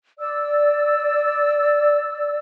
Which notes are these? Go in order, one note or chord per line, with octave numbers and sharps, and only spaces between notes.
D5 E6